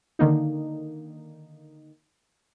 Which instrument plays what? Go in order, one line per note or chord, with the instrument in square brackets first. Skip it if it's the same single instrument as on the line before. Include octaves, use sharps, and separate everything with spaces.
[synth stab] D3 D#3 A#3 D#4